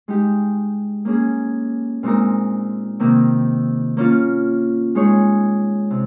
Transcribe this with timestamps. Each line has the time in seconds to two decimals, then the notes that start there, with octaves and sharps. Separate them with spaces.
0.08 G#3 D#4 G4
1.05 A#3 C#4 G#4
2.03 A#2 G#3 C4 D#4 A#4
3.00 C3 D#3 A#3
3.97 A#3 C#4 F4
4.95 G#3 D#4 G#4 C#5
5.91 C3